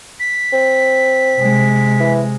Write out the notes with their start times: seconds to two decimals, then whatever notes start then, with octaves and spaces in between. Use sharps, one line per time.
0.20 B6
0.53 C4
1.38 C3 G#3
2.00 E3